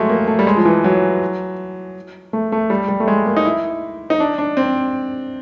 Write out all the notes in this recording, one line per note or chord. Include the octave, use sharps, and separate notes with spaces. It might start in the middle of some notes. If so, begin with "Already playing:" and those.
Already playing: F#3 G#3 A3
A#3
A3
G3
G#3
F3
E3
F#3
A3
A3
G3
G3
A3
G#3
A#3
D#4
E4
D#4
D4
D4
C4